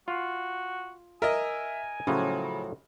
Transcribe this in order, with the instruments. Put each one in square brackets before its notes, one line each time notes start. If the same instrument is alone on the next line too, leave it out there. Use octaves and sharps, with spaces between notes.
[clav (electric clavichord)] F4 F5 [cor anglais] F#4
[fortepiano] A#4 D#5 [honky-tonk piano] E5 [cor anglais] G#5
[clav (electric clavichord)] A2 F3 F#3 [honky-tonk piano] C#3